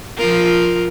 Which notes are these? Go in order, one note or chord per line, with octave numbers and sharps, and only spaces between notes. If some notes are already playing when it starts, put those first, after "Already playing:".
F3 F4 A#4